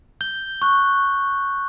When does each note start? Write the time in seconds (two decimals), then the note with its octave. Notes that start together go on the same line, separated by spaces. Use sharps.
0.21 G6 G7
0.62 C#6 F#6